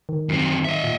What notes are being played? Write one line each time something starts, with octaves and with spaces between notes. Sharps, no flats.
D#3
F#2 C4
D#5 E5
A#2